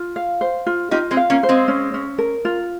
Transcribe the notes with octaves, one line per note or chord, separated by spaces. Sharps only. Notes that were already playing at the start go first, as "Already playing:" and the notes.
Already playing: F4
F5
C5
F4
D#4 F4 G4
G#3 C4
F5
A#3 C#4
C5
G#3 C4
C#4
C#4
A#4
F4